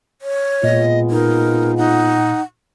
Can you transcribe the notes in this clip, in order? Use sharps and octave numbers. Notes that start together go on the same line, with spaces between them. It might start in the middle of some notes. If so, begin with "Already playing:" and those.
C#5
A#2 G#3 B3 F4 D#5
D#4 A#4
D#4 F#5